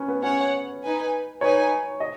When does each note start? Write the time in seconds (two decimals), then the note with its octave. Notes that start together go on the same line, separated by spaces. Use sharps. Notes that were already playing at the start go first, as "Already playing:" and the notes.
Already playing: C#4 B4
0.08 B3
0.22 C#4 G#4 C#5 F#5
0.82 D#4 B4 G#5
1.41 D#4 B4 C#5 G#5
2.00 D#5